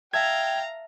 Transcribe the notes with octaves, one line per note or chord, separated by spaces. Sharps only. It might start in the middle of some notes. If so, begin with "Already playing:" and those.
E5 F5 G5 A5 A#5 G#6